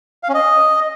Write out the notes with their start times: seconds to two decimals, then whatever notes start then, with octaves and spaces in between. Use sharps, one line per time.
0.23 F5
0.29 C#4
0.34 D#5